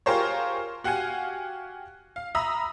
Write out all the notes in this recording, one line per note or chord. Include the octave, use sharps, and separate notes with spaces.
F4 G4 G#4 A#4 C5 C#5
F#4 G4 F5 F#5 G#5
F5
E5 A#5 B5 D#6 E6